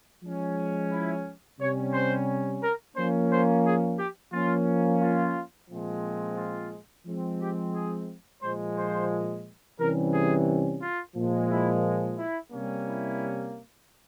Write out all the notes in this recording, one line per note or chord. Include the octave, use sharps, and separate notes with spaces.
F3 G#3 C#4
E4
C3 G3 C#4 C#5
C5
A#4
F3 A#3 C#4 C5
C5
G#4
G4
F3 A#3 C#4 F4
F4
A#2 F3 G#3 C4
F4
F3 G#3 C4
G4
G#4
A#2 F3 G#3 C5
C5
C3 E3 G3 C#4 A#4
G#4
F4
A#2 F3 G#3
E4
E4
C3 G3 A#3 C#4
E4